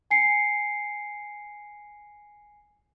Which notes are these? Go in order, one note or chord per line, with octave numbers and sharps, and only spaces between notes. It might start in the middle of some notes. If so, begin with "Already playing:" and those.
G#5 C7 C#7